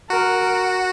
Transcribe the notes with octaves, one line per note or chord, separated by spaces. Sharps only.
F#4 A#4